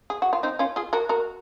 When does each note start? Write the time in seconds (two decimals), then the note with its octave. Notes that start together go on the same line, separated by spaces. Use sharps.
0.10 G#4
0.22 F#4
0.33 F4
0.43 C4 D#4
0.59 C#4 F4
0.76 F4 G#4
0.93 F#4 A#4
1.09 F#4 A#4